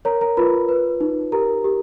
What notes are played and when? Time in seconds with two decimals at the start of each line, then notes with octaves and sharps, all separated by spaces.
0.05 A#4 C#5 A#5
0.21 A#4 A#5
0.37 F4 B4 B5
0.69 B4
1.01 D#4
1.32 G4 A#4 A#5
1.64 G4